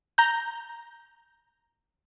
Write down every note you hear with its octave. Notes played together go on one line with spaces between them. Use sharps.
A#5 G6